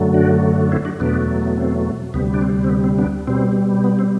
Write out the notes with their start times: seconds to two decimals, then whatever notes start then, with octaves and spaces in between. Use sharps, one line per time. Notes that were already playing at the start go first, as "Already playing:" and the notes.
Already playing: F#2 D3 F#3 A3
0.14 D4 F#4
0.72 C4 E4
0.85 D4 F#4
1.00 E2 B2 F#3 A3 B3 D4
1.57 C4
2.14 D2 C3 G3 B3
2.34 D4
2.41 C4
2.64 C4
2.70 B3
2.84 C4
2.99 B3 D4
3.27 B2 G3 C4
3.84 B3
3.99 C4